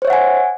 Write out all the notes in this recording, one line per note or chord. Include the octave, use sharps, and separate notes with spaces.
C5 C#5 E5 F#5 G#5